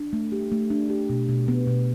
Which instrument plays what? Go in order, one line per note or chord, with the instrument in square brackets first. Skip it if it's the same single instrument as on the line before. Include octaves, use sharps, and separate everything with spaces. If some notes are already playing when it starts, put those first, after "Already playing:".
Already playing: [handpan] D4
A3
G4
A3
D4
G4
B2
B2
B3
B2